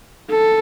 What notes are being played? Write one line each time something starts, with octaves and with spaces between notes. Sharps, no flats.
A4